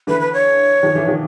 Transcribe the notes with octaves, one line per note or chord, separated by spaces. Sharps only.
D3 E3 B4
B4
C#5
D#3 F3
D3 E3
D#3 F3